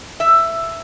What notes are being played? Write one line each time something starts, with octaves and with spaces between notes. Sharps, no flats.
E5